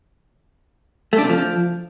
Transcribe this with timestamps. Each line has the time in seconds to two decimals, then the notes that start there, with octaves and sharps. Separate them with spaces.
1.13 A3
1.18 D4
1.24 C3
1.29 F3